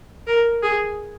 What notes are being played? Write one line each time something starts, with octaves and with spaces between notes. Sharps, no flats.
A#4
G#4